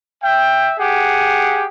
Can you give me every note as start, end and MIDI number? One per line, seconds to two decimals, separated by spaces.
0.23 0.73 76
0.23 0.73 79
0.79 1.67 67
0.79 1.67 68
0.79 1.67 78